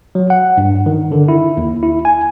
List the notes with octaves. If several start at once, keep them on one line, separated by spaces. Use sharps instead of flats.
F#3
F#5
G2
D#3
D3
E4
D#2
E4
G#5